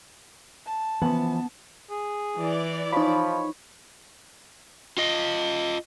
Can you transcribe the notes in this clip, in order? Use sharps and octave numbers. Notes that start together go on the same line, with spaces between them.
A5
E3 F3 B3
G#4
E3 D5
F3 D#4 C#5 B5
F4 D#5